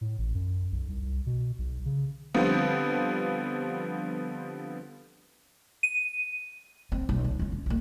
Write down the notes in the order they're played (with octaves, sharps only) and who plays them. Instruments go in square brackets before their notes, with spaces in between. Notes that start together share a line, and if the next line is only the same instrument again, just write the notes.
[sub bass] A2
A1
F#2
B1
C2
C2
B2
B1
C#3
[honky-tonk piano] D3 F3 G3 B3 C4
[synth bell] D#7
[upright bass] C4
B1
D2
C#2 C#4
C#4
B1 A#3